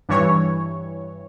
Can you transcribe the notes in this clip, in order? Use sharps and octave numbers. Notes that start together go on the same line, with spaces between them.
G2 E3 C#5